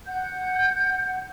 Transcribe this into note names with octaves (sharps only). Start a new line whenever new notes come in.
F#5 G6